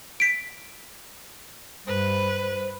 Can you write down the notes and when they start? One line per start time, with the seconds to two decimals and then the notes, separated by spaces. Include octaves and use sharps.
0.20 B6 D7
1.87 G2 B4 C5